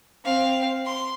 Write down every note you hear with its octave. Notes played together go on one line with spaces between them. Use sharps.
C4 F5
C6